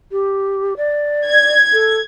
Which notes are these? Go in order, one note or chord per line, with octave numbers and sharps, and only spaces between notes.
G4
D5
G#6
A4